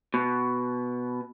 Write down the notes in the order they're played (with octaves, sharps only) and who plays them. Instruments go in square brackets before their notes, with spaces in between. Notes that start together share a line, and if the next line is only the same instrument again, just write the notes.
[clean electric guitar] B2